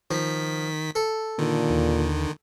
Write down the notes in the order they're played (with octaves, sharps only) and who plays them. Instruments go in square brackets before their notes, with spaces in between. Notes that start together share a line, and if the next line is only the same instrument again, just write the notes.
[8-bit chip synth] D#3 B6 [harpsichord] F3
[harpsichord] A4
[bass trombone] A#2 [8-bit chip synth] D3 D#3
[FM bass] D#2